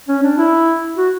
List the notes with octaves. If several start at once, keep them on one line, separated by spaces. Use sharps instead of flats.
C#4
D4
E4
F#4